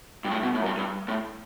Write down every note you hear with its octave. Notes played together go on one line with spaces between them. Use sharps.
G2
A2
B2
A2
F#2
G2
G2
A2